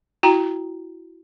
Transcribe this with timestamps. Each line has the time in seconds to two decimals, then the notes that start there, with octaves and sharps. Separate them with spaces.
0.23 E4 F#4 G5 A#5